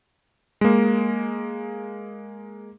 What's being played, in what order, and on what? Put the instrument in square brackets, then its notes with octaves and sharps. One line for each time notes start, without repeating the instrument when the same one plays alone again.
[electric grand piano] G#3 A#3